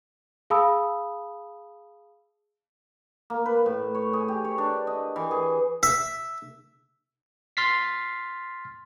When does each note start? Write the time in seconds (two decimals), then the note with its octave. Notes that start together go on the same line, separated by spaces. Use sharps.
0.50 G#4 F5 A5 B5 D#6 E6
3.30 A#3
3.46 B4
3.66 A2
3.95 C#5
4.13 G#4
4.28 G4
4.44 C#5
4.58 D4
4.87 D#5
5.16 E3
5.31 G#4
5.83 E5
7.57 C6 F6 A6 B6 C7